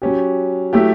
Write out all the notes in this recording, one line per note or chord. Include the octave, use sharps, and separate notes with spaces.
F#3 C#4 G4
F#3 A3 E4 G4